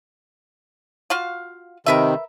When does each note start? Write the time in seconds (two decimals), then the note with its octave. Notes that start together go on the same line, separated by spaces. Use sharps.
1.10 F4 F#4 F5
1.86 C3 D#3 A#4 B4 E5